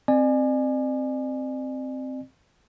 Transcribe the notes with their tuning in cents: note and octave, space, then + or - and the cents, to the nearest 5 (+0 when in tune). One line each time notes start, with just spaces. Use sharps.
C4 +0 D5 +40 G#5 +0